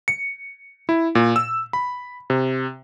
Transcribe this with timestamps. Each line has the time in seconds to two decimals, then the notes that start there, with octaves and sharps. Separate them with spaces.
0.08 C#7
0.89 E4
1.15 A#2
1.36 E6
1.73 B5
2.30 C3